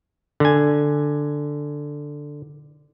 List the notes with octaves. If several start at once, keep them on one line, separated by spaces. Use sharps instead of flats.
D3 G#5